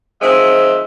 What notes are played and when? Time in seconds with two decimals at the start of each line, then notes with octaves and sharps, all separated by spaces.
0.21 D#3 F3 G#3 C4 E5